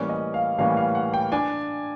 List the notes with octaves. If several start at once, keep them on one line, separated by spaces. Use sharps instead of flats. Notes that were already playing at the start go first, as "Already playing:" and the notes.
Already playing: A2 E3 G3 A#3 C#4 D5
D#5
F5
A2 E3 G3 A#3 C#4 F5
F5
F#5
G5
D4 G#5